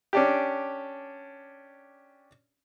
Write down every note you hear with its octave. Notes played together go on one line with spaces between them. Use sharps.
C#4 D4 G4